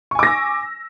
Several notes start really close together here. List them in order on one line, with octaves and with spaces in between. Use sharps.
C#6 G#5 D6 A#6 E6